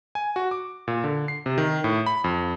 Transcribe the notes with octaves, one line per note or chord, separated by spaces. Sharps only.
G#5
F#4
D6
A#2
D3
C7
C3
D#3
A2
B5
F2